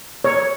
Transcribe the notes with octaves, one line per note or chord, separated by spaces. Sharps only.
C#5